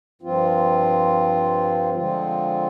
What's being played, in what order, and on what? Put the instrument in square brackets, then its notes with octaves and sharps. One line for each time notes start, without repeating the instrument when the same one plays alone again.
[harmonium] G2 F3 C4 F4
D3 F3 G#3 C4 F4